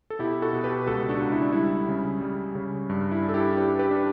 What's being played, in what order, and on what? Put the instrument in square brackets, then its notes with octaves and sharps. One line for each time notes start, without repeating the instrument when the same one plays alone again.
[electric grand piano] A4
B2 E4 G4
F#4 A4
B2
G4 B4
C#2 F#4 A4
D4 F#4
C#2
E4
D4
G3 E4
C#3
G3
C#3
G2
E4
D4
A4
E4 G4
D4 G4 B4
G4 B4
D4